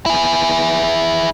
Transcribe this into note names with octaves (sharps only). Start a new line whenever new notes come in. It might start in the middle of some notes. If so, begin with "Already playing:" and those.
E4 G#4